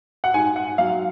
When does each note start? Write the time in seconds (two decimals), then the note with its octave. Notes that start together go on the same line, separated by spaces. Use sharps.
0.24 F#5
0.34 G#2 G#5
0.56 F#5
0.78 F#3 F5